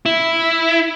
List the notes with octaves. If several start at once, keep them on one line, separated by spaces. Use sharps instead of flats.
E4